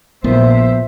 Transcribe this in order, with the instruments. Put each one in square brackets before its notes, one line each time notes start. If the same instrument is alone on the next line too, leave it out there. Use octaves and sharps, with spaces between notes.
[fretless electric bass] A#1 B3 [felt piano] A#2 [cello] C5 E5